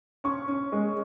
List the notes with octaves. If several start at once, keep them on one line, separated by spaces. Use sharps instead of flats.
C#4 C#6
C#4
G#3